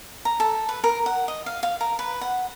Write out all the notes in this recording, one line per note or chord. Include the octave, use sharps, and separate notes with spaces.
A#5
A4
B4
A#4
F#5
D#5
F5
F5
A#4
B4
F#5